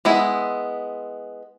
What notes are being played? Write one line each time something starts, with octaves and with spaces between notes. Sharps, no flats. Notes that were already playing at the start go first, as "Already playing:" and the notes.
G#3 B3 E4